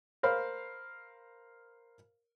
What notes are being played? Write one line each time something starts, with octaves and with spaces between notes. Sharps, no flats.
A#4 C5 F5 B5